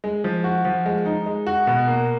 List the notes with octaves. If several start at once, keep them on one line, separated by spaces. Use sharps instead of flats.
G#3
F3
F#4
F3
G#3
D#4
G#3
F#4
B2
A#3